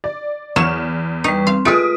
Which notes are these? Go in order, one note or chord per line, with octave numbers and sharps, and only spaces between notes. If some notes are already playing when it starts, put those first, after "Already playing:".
D5
E2 F#3 F6 E7
G3 D#4 B4 C#6
C4 F5
G#3 A3 F4 B4 D#6 D7